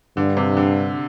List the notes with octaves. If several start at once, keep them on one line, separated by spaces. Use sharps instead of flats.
G2 D3
C3
D3